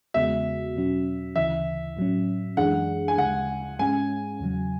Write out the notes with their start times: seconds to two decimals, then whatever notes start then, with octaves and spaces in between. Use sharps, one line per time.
0.14 E2 C#3 G#3 B3 F#4 E5
0.75 E2 B2 F#3 C#4 F#4
1.36 D2 C#3 E3 E5
1.97 A2 F#3 C#4
2.57 F#2 E3 G#3 D4 G#4 F#5
3.08 G#5
3.18 D2 C#3 G#3 F#5
3.79 G#2 G#3 C#4 G#5
4.40 E2 C#3 F#3